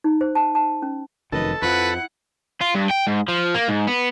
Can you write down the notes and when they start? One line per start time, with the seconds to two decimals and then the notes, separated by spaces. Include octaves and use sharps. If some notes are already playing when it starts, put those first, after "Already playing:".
0.04 D#4
0.21 C5
0.35 A5
0.55 A5
0.82 C#4
1.32 F1 F#2 D#3 A4 B4 D#5
1.62 F2 F3 E4 B4 F#5
2.61 F4
2.75 G2
2.91 G5
3.07 G#2
3.28 F3
3.54 A#3
3.68 G#2
3.87 B3